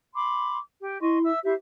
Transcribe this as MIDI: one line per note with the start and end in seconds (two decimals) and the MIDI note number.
0.15 0.59 83
0.15 0.59 84
0.15 0.59 86
0.81 1.00 67
1.01 1.31 64
1.01 1.19 75
1.01 1.19 84
1.01 1.19 85
1.23 1.39 76
1.23 1.39 88
1.44 1.54 64
1.44 1.54 67
1.44 1.54 72
1.44 1.54 76